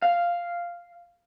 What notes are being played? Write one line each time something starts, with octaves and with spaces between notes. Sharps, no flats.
F5